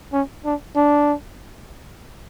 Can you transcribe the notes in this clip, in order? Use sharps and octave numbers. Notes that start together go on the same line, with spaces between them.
C#4
D4
D4